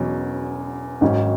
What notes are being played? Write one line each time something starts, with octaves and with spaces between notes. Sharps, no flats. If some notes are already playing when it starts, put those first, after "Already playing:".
Already playing: E1 E2 B2 F#3 C#4
G#1 G#2 F#3 C#4